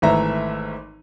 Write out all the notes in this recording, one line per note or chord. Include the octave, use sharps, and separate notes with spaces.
G#1 E3 A3 E5 A#5